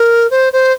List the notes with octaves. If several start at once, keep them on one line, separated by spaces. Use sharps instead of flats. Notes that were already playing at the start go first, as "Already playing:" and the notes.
Already playing: A#4
C5
C5